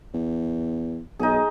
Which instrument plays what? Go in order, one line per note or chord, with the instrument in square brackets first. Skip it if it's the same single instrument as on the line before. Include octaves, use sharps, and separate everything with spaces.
[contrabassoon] E2
[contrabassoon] B1 [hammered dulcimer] D#4 G#4